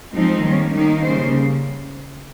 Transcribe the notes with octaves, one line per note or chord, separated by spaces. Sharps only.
F3 G#3 C4 D#4
D#3 G3 A#3 C#4
D#3 A#3 D#4
C#3 G3 A#3 C5